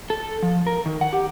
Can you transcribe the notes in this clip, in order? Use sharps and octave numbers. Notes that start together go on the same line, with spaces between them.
A4
F3
A#4
D#3
F#5
G4